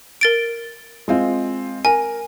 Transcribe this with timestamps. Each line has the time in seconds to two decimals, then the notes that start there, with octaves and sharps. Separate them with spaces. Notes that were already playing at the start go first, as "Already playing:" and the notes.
0.21 A#4 A6 D7
1.08 G#3 C4 F4
1.85 A#4 G#5